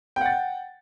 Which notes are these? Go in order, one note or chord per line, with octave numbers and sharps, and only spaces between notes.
F#5 G5 A6